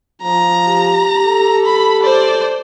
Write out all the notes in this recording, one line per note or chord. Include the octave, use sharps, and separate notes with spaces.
F3 A#5
G4
A4
B5
C5 D5